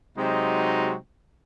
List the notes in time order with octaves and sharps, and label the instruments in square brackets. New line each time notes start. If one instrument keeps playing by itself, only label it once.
[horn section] C3 F#3 G#3 C4 D#4 F#4